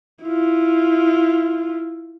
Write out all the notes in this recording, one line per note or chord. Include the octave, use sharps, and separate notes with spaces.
E4 F4